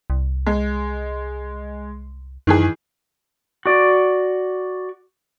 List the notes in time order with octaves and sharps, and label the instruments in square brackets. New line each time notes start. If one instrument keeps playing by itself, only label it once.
[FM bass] C2
[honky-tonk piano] G#3
[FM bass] F#2 [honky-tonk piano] D#3 E3 G#4
[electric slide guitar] F#4 D5